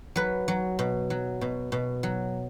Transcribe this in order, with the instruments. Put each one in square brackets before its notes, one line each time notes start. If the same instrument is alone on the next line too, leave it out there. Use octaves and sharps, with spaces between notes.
[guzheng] F#3 B4
F#3
B2
F#3
B2
B2
F#3